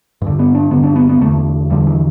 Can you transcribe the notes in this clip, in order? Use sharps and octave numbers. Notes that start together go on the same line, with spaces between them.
G2 D3
B3
D4
G2 D3 B3
D4
B3
B3
E2 D3 A3
E2 D3 G3
E3